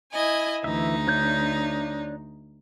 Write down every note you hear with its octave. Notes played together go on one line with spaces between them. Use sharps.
E4 D#5 G#5
D2 E3 D#4 E5
D4 C#5 G6